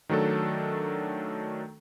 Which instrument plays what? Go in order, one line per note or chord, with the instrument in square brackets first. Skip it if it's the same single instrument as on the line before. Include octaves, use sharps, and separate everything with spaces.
[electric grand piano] D#3 F#3 A3 D4 A4